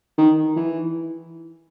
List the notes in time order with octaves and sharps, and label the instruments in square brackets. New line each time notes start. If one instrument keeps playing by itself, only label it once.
[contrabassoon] D#3
E3